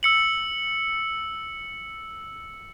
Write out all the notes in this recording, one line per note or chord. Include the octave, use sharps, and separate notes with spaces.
E6 C#7 F#7